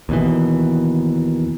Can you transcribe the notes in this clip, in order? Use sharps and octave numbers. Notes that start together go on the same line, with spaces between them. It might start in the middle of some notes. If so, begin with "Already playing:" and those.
D#2 B2 E3